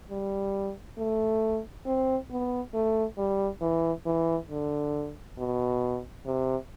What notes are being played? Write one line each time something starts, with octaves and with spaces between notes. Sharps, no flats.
G3
A3
C4
B3
A3
G3
E3
E3
D3
B2
C3